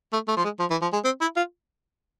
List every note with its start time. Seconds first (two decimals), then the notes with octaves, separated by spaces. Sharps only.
0.13 A3
0.28 A3
0.37 F3
0.44 G#3
0.60 F3
0.71 E3
0.82 F3
0.93 G#3
1.05 C4
1.21 E4
1.37 F4